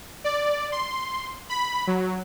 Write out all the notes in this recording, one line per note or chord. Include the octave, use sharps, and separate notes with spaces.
D5
C6
B5
F#3